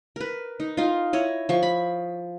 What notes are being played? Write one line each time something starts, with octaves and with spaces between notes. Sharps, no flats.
A#4 B4
D#4
D#4 F4
E4 C#5 D#5
F3 C#6
B5